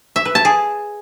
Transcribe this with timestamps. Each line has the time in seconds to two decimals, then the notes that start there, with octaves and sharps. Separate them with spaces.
0.16 E5
0.25 B4
0.35 A5
0.45 G#4